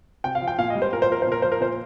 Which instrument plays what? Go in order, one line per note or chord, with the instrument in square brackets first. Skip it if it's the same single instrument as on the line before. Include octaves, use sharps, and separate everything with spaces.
[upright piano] C3 G5
F5
F3
G5
A#2 F5
D#5
G3
C5
A#2 A#4
C5
F3 A#4
C5
A#2 A#4
F3 C5
A#4
A#2 C5